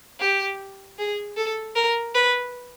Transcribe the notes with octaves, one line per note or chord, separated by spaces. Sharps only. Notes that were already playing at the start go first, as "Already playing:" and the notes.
G4
G#4
A4
A#4
B4